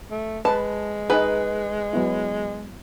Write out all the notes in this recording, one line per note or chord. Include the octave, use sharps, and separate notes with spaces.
A3
G#3 B4 A5
D#4 G#4 B4
F#3 B3 E4